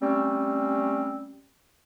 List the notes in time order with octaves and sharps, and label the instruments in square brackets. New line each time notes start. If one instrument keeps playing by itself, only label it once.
[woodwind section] G3 A3 C4 C#4